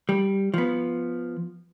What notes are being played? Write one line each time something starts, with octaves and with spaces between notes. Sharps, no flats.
G3
F3 B3